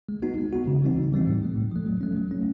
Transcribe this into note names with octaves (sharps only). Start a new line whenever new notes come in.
G#3
B3 D#4 F#4
G#3
B3 D#4 F#4
C#3
E3 G3 C4 D#4
C#3
E3 G3 C4 D#4
A2
F3 A3
A2
F3 A3
F#3
A3 C#4
F#3
A3 C#4